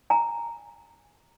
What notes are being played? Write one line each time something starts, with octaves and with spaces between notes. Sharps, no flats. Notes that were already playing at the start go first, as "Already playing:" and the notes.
G#5 A#5